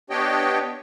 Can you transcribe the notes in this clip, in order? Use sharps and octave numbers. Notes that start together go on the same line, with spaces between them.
B3 D4 G4 C#5 D#5 G5